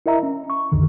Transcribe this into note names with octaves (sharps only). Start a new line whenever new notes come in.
E4 A#4 D#5 E5 A#5
C#4
C#6
B1 F2 D3 D#3